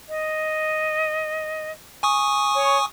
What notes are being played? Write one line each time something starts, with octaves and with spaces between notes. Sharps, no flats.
D#5
G#5 C#6 D#6
C#5